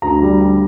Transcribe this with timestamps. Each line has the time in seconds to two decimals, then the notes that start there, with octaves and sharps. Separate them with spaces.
0.02 D2 A#5
0.22 G3
0.41 G3 A#5